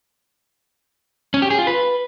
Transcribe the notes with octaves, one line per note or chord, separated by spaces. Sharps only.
C#4
G4
G#4
F4
B4